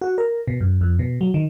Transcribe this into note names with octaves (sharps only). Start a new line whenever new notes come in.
F#4
A#4
B2
F#2
F2
B2
F#3
D#3